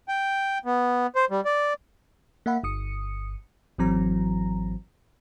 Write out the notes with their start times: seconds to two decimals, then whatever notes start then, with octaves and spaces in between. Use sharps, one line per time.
0.08 G5
0.65 B3
1.15 C5
1.31 G3
1.45 D5
2.46 A#3 E5 F#5 B5
2.63 G1 D#6 C#7
3.78 G#1 E3 F#3 C4 A#5